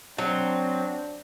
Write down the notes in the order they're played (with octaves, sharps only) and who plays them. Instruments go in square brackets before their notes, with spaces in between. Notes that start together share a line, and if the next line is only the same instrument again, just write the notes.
[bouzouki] F#3 [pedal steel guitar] C4 [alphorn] D4